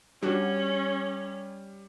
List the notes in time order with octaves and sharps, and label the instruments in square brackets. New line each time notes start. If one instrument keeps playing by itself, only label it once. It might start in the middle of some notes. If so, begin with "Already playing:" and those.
[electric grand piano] G3 [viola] C#4 [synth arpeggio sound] D4 F#4